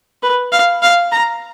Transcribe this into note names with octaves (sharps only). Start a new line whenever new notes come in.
B4
F5
F5
A#5